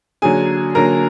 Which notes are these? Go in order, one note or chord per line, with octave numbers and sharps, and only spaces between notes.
D3 F#3 A#3 G#4 G#5
D3 F#3 A#3 A#4 A#5